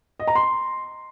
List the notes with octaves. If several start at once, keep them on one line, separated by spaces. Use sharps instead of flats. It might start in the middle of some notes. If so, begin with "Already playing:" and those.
D#5
A#5
C6